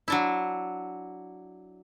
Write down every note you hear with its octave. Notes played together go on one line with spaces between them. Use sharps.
F#3 D4 E4